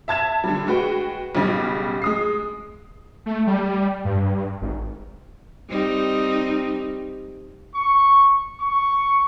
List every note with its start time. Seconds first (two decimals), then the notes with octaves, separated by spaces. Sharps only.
0.08 E5 A5 G#6 E7
0.44 D3 G3
0.67 G#3 F#4 B4 G5
1.35 B1 C#3 G3
2.02 G#3 D#6 C7
3.26 A3
3.47 G3
4.05 G2
4.62 G#1
5.69 G3 C4 D#4
7.74 C#6
8.60 C#6